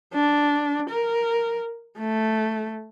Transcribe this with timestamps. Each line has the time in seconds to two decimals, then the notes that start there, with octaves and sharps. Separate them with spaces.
0.14 D4
0.90 A#4
1.99 A3